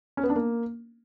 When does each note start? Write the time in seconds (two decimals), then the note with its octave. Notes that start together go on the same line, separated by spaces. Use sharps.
0.17 C#4
0.24 B3
0.30 D4
0.36 A#3